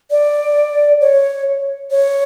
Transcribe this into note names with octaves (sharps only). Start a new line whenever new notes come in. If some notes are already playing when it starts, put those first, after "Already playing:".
D5
C#5
C#5